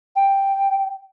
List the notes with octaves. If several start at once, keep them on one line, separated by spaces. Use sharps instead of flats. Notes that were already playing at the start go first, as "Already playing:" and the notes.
G5